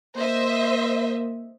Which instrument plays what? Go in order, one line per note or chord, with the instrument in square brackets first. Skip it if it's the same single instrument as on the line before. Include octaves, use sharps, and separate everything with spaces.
[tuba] A#3 [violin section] C5 D#5 E5